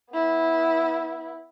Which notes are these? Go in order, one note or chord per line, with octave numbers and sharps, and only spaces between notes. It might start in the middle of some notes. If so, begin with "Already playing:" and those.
B3 E4